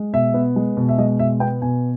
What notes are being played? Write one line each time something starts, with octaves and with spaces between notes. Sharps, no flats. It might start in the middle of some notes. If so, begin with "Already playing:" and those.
Already playing: G#3
B2 E5
B3
G#3
B2
E5
G#3 D#5
B2 E5
B3 G5
B2 G#5